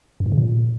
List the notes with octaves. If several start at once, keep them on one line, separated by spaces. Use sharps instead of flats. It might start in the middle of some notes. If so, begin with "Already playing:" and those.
F#2
G#2
C#3
A#2